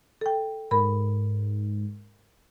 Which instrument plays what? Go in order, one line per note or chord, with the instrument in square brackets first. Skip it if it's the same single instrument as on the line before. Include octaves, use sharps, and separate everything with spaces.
[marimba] A4 G5
[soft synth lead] G#2 [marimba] A#4 B5